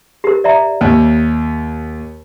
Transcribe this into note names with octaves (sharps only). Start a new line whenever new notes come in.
G4 A#4
D5 E5 A#5
D#2